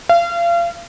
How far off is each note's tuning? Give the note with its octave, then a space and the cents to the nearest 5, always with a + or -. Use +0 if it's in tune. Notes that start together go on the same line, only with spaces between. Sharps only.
F5 -35